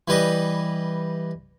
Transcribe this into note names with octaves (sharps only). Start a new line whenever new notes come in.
E3 G3 B4 D#5